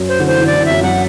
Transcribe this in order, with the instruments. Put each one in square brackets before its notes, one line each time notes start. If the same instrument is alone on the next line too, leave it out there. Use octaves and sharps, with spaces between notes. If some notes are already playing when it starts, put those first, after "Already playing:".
Already playing: [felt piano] F#2 F#3
[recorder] C5
[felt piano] D3
[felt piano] E3 [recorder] C5
[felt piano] D3
[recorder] D5
[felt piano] E3
[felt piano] F#2 F#3 [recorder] E5
[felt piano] F#2 F#3 [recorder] F#5